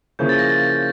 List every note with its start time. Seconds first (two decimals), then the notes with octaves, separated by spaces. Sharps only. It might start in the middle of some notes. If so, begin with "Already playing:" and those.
0.19 C#3 F3 A#3 C#4 E4 G6
0.29 A6
0.39 A#6
0.49 A6